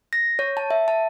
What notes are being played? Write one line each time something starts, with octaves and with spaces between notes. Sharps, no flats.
A#6
C#5
A5
E5
A5